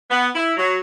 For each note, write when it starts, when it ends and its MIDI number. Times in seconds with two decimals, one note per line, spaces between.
0.10 0.26 59
0.34 0.53 64
0.56 0.77 54